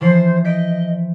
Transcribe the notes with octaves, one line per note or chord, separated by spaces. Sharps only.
E3 F3 C5 C7
D#5 G6 B6 D7